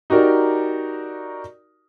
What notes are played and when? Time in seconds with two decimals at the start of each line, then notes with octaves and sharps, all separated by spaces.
0.10 D#4 F#4 G4 A#4 D5